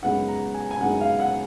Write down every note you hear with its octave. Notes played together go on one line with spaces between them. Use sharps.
F#2 C#3 G#3 B3 D#4 F#5
A#5
G#5
G#5
F#2 C#3 G#3 B3 D#4 F#5
F5
F#5